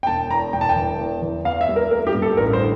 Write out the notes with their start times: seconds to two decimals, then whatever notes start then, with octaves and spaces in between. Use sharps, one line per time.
0.03 G5
0.07 E1 A5
0.31 E2 A#5
0.53 E1 G5
0.61 A5
0.69 G5
0.76 E3
0.99 E2
1.22 E3
1.45 E2 F5
1.61 E5
1.68 G3
1.76 A#4
1.91 A3 A#4
2.07 G4
2.15 G2
2.22 A4
2.37 A1 A#4
2.53 C5
2.60 D3